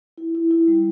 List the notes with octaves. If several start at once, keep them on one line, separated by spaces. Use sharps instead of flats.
E4
E4
E4
G3